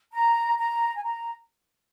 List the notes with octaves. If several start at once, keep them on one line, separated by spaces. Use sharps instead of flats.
A#5
A#5
G#5
A#5